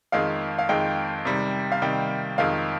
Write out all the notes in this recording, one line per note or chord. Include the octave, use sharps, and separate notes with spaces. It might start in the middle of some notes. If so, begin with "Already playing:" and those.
F2 D#3 G#3 F5
F5
F2 D#3 G#3 G5
C3 D#3 G3
F5
C3 D#3 G3 G5
F2 D#3 G#3 F5